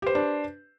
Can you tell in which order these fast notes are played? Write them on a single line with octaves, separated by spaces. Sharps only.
G4 C5 B4 D4